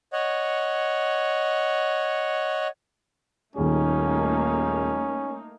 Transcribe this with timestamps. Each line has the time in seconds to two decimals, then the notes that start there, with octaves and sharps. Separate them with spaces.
0.13 C#5 D#5 F#5
3.56 D#1 D#2 A3 A#3 C#4 D#4 G#4